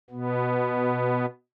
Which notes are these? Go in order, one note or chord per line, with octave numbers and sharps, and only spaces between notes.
B2 B3